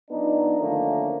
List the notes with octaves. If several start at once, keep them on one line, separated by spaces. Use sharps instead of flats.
F3 B3 D4 D#4
D3 D#3 F3 A3 A#3 C#4